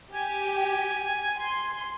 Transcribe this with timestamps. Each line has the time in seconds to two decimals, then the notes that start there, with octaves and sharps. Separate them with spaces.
0.13 G4 G#5
1.38 C6